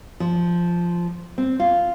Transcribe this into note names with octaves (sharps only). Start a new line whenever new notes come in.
F3
C4
F4